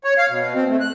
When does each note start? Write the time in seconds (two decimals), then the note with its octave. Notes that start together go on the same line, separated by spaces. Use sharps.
0.04 C#5
0.18 F5
0.30 B2
0.54 C4
0.69 A3
0.80 F#6